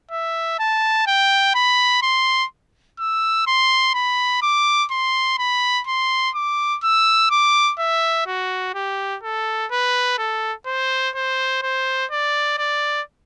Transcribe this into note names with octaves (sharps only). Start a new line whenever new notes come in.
E5
A5
G5
B5
C6
E6
C6
B5
D6
C6
B5
C6
D6
E6
D6
E5
F#4
G4
A4
B4
A4
C5
C5
C5
D5
D5